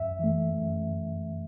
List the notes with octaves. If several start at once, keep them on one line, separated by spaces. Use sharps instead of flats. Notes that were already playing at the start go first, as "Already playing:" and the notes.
Already playing: F#2 E5
E3 A3
F#2